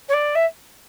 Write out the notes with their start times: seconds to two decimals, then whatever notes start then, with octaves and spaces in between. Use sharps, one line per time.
0.09 C#5
0.13 D5
0.35 E5